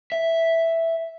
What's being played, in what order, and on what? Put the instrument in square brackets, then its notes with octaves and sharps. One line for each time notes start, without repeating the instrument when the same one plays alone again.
[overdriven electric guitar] E5